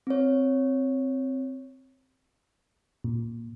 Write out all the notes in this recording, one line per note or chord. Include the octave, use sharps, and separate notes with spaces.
C4 C#5
A#2